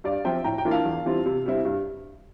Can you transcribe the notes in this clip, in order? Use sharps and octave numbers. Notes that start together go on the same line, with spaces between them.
G2 D5 F5
F3 C4 F4 E5 G5
A2 G5 A#5
G5 A#5
E3 A#3 D4 F4
F5 A5
E2
E3 G3 C4 F4
C3
G3 C4 E4
G2